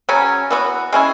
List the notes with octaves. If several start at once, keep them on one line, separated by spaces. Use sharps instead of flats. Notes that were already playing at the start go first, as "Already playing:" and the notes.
C#3 F#3 C#4
E3 B3 F#4
G#3 C#4 E4 G#4